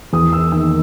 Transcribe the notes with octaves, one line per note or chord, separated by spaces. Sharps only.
E2 D#6
E6
D#3 A#3 E6